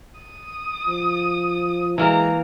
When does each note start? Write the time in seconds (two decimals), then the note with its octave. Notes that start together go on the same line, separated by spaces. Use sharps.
0.20 D#6
0.87 F3
1.98 E3 G#3 A#3 A#5